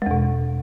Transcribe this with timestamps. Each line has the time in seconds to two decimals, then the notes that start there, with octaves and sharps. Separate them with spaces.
0.02 G#3
0.06 E2
0.11 B2